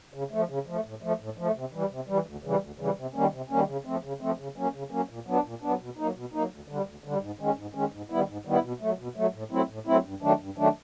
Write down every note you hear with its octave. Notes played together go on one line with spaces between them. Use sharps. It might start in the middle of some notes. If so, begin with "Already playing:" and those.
C#3
F3 A3
C#3
F3 A3
A2
F3 A3
A2
F3 A3
C3
E3 G3
C3
E3 G3
D2
C#3 E3 G3
D2
C#3 E3 G3
C3
D#3 G3 A#3 C#4
C3
D#3 G3 A#3 C#4
C#3
F3 A3 C4
C#3
F3 A3 C4
C#3
F#3 A#3 C#4
C#3
F#3 A#3 C#4
A#2
F#3 B3 D4
A#2
F#3 B3 D4
B2
F#3 A#3 D#4
B2
F#3 A#3 D#4
D2
D3 G3
D2
D3 G3
G#2
D#3 G#3 C#4
G#2
D#3 G#3 C#4
G#2
D#3 G3 B3 E4
G#2
D#3 G3 B3 E4
B2
F#3 A3
B2
F#3 A3
A2
F#3 A3 C4 E4
A2
F#3 A3 C4 E4
G2
D#3 F#3 A3 D4
G2
D#3 F#3 A3 D4